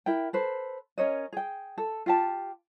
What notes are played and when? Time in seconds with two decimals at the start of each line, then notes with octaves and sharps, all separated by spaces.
0.06 E4 A#4 G5
0.33 A4 B4 C5
0.98 C#4 A#4 C#5 D#5
1.32 G#4 G5
1.78 A4
2.06 F4 G4 A5